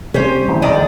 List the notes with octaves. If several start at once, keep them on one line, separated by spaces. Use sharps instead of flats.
C3 G3 C#4 G4 C5
D1 E3
D1 D#3 D5 D#5